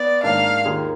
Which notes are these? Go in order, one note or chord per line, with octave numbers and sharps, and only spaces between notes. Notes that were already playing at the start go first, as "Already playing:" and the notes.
Already playing: B3 D5
G#2 D#3 A#3 D4 F5
D#2 D#3 A#3 F4 G#4